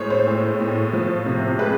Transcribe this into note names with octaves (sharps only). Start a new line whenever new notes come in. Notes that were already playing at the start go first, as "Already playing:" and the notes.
Already playing: A2 G#3 C5 C#5
C5
A2
A2
F3
C3
G#3 B4